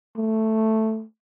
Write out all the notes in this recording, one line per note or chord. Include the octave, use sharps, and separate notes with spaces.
A3